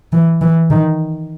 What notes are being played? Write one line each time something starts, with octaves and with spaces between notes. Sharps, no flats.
E3
E3
D#3